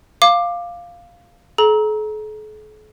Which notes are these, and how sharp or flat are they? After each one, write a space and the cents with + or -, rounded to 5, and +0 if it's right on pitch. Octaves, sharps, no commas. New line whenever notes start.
F5 +0 D6 +15
A4 -45 A#5 +15